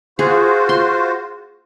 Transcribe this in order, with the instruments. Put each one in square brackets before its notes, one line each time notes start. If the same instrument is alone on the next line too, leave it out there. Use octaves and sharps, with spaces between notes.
[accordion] F4 F#4 C5 [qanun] G#4
[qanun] C6